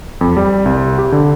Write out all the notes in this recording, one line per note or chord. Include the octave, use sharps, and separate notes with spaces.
F2
G3
C2
G4
D3